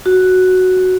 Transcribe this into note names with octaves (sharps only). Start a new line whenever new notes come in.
F#4